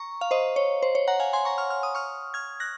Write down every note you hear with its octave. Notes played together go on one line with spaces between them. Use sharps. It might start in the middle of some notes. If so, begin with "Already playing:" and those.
Already playing: A#5 C#6
F5
C5 D#5
C#5
C5
C#5
F#5 A#5
F5 G#5
G#5 C6
A#5 C#6
C#6 F6
F6
D#6
C#6 F6
F6 G#6
F#6 A#6